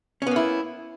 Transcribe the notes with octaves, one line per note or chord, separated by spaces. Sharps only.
A#3 B3 C#4 E4